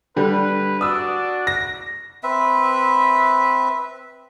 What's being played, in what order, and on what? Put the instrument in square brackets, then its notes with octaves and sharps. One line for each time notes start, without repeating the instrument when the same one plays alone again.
[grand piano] D3 G3 [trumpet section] B4
[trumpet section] D4 F#4 D5 [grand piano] D#6 E6
[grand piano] A#6
[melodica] C4 B4 E5